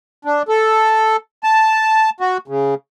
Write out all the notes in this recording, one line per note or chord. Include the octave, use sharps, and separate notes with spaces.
D4
A4
A5
F#4
C#3